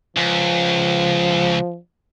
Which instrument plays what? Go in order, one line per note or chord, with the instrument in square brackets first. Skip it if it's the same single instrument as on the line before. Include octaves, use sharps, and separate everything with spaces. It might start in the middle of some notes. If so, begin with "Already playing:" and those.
[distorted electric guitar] C#2 [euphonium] F3